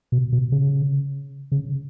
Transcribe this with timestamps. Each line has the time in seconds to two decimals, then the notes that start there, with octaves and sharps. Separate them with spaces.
0.12 B2
0.33 B2
0.52 C#3
1.52 C#3